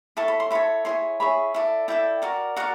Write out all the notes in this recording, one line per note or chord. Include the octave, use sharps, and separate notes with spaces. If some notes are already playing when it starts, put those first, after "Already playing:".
E4 A4 C#5 A5
B5
C6
E4 A4 C#5 B5
E4 G#4 C#5 C6
E4 G#4 C#5 B5
E4 A4 D5
E4 A4 D5 G5
F#4 A#4 D5
F#4 A#4 D5 F#5